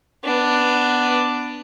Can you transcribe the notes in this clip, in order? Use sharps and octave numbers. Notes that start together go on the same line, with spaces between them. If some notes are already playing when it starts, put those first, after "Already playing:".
B3 D4